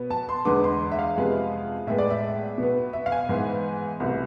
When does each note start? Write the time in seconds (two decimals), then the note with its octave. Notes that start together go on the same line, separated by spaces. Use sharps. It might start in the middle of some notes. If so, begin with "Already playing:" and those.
Already playing: B2 B3
0.10 A5
0.29 C6
0.45 E2 D3 G#3 B3 D6
0.64 C6
0.92 E5
0.99 F5
1.16 F2 C3 G#3 B3
1.87 A2 G#3 B3 E5
1.98 D5
2.10 E5
2.58 B2 B3
2.93 E5
3.06 F5
3.12 G#5
3.29 G#2 E3 B3
4.00 C2 B2 A3